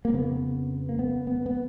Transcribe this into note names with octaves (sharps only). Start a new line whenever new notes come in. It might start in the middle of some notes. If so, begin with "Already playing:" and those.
A#3
F2 C#3 B3
A#3
B3
B3
B3